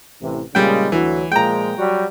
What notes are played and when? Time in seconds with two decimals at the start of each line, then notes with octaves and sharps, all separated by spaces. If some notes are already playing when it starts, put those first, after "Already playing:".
0.22 A1 C3 E3
0.55 A#2 C#3 G3 G#3 G5
0.92 D2 E3 F#3
1.32 A#2 F3 G#3 G5 A#5
1.78 F#3 G3 F#4